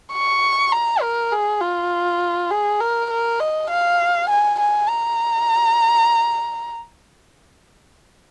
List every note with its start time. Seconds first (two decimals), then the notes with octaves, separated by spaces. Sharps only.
0.13 C#6
0.72 A#5
1.02 A#4
1.32 G#4
1.61 F4
2.51 G#4
2.80 A#4
3.11 A#4
3.40 D#5
3.70 F5
4.29 G#5
4.60 G#5
4.89 A#5